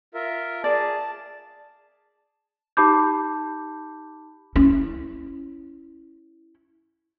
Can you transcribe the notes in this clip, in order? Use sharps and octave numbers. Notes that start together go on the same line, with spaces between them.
F4 A#4 E5
G#4 D5 A5
D#4 G4 A5 B5 D6 G6
C#4 E4